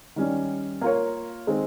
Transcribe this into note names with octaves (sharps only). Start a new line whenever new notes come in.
D#3 G3 C#4
A#3 F4 A#4 C#5
D#3 G#3 C4